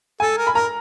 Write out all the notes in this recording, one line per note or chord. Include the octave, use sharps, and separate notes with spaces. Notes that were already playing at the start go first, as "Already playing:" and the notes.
A4 G#5
A#4
B5
A#4 A#5